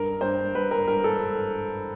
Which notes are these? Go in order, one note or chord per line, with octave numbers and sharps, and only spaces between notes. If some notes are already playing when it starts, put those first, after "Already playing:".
Already playing: G2 A#4
G2 C5
G2 B4
A#4
G2 A#4
A4